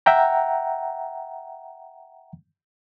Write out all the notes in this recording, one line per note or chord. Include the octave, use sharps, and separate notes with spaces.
E5 F#5 G5 A#5